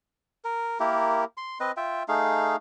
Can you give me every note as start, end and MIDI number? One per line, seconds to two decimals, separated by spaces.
0.44 0.79 70
0.80 1.24 58
0.80 1.24 64
0.80 1.24 67
0.80 1.24 70
1.37 1.58 84
1.60 1.71 60
1.60 1.71 71
1.60 1.71 75
1.77 2.03 65
1.77 2.03 76
1.77 2.03 79
2.08 2.56 57
2.08 2.56 63
2.08 2.56 68
2.08 2.56 77